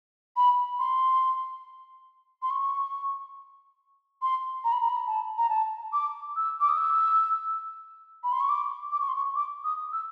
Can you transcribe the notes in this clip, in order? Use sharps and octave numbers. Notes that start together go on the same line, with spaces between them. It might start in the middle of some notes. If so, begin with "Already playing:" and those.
B5
C6
C6
C#6
C6
A#5
B5
A#5
B5
A#5
A5
A#5
A5
D6
E6
D6
D#6
E6
B5
C6
C#6
D6
D6
C#6
C6
C#6
D6
D#6
E6